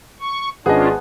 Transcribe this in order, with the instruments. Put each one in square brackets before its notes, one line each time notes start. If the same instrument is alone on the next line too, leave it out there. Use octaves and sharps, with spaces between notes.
[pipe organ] C#6
[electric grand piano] G#1 D#5 [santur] B3 A5 [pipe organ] C#4 D4 F4 [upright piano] G#4